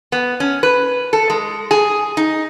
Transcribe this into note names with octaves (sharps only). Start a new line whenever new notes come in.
B3
C#4
B4
A4
G#3
G#4
D#4